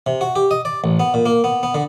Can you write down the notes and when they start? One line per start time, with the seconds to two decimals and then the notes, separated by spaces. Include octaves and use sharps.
0.06 C3
0.21 F#4
0.36 G4
0.51 D#5
0.65 D5
0.84 A1
1.00 B3
1.14 A#2
1.26 A#3
1.44 B3
1.63 B3
1.74 D3